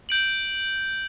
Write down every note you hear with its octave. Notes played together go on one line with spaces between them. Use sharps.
G6 D7 F#7